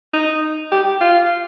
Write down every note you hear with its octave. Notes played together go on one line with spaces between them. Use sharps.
D#4
G4
F4